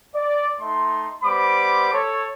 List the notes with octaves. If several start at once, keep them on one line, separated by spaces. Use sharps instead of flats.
D5
A3 D#4 C6
G3 B3 C5 B5 D6
A4 C#5